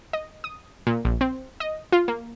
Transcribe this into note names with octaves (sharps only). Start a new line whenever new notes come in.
D#5
D#6
A#2
A#1
C4
D#5
F4
A#3